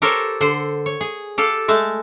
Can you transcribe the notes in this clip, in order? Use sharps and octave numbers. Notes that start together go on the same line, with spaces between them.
G4 A4 A#4 C5 C#5
D3 C5 F#5
C#5
G#4
G4 A4 F5
G#3 A3 A5